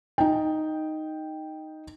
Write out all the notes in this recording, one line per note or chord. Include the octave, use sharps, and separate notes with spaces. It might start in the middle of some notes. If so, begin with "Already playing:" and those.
D#4 G5